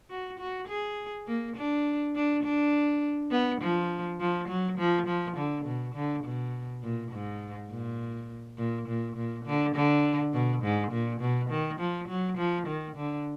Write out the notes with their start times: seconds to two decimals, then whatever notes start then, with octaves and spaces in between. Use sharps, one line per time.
0.10 F#4
0.40 F#4
0.68 G#4
1.28 A#3
1.57 D4
2.15 D4
2.44 D4
3.31 B3
3.61 F3
4.20 F3
4.48 F#3
4.78 F3
5.07 F3
5.37 D3
5.65 B2
5.95 D3
6.24 B2
6.83 A#2
7.12 G#2
7.71 A#2
8.58 A#2
8.88 A#2
9.16 A#2
9.45 D3
9.75 D3
10.33 B2
10.63 G#2
10.92 A#2
11.21 B2
11.50 D#3
11.80 F3
12.09 F#3
12.38 F3
12.67 D#3
12.96 D3